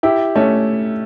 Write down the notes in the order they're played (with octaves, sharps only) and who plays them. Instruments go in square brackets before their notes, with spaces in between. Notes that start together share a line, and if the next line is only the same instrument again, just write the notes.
[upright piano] E4 G4
A3 C#4